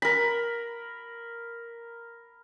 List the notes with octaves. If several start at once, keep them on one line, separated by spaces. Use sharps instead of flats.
A#4 B5